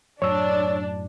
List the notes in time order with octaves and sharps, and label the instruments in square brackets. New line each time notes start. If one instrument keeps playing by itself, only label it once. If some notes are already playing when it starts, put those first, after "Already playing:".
[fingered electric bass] F#2 A2 F#3 [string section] D4 [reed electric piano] C#5 E6